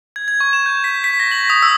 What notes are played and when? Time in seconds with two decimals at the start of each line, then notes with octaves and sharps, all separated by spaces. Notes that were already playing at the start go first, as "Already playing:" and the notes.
0.16 G#6
0.28 G#6
0.40 C#6
0.53 E7
0.66 G6
0.84 B6
1.04 B6
1.20 A#6
1.31 F#7
1.50 D#6
1.63 E6